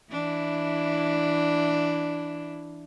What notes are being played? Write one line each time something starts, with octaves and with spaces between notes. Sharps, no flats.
E3 D4 E4